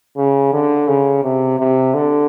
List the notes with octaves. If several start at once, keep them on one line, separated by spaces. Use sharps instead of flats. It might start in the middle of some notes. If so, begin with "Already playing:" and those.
C#3
D3
C#3
C3
C3
D3